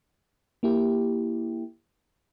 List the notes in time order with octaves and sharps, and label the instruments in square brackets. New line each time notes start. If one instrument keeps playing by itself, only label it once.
[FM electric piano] A#3 E4 G4